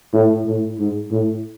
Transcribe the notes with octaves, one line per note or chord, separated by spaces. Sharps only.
A2
A2
G#2
A2